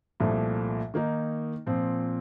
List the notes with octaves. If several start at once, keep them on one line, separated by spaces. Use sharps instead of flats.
C2 A#2 F3 A3
D#3 A#3 D#4
A#2 F3 C4